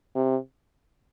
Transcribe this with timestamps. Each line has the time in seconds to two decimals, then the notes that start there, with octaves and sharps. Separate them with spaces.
0.16 C3